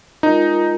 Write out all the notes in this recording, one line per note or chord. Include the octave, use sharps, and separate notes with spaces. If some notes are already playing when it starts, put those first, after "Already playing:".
G#3 D#4 F4 A#4